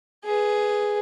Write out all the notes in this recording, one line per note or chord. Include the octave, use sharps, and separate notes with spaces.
G#4 B4